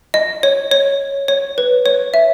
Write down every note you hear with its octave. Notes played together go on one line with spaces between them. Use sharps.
D#5
C#5
C#5
C#5
B4
C#5
E5